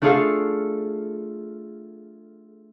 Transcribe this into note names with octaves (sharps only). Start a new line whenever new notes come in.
A3 D4 F4 G#4 A4 F5